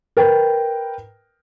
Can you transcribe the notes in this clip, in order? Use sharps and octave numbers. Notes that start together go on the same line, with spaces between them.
A#4 B4 G5